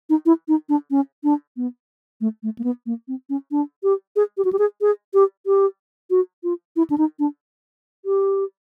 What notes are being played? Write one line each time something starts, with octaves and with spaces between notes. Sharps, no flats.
D#4
E4
D#4
D4
C#4
D4
B3
A3
A3
A#3
B3
A#3
C4
C#4
D4
G4
G#4
G4
F#4
G4
G#4
G#4
G4
G4
F#4
F4
E4
D4
D#4
D4
G4